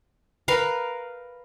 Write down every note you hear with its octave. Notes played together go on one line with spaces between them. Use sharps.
A#4 B4 F5